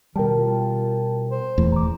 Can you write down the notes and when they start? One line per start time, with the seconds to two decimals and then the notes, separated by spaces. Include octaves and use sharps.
0.16 B2 D#3 G3 A#4 G5 A5
0.38 F4
1.31 C5
1.58 D#1 E2 A3
1.72 A#5 D6